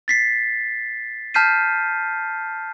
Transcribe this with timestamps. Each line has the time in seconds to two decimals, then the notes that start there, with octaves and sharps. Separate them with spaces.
0.08 A6 B6 C7
1.34 A5 F6 G6 B6 C7 D#7